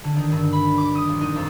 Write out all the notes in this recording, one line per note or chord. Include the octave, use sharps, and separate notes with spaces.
D3
D#3
G2
B5
D6
D#6
A#1
D#4
F2